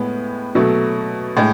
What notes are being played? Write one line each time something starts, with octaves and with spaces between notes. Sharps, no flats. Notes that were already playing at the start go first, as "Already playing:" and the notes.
Already playing: A2 G#3 B3
B2 F#3 A3
A2 G#3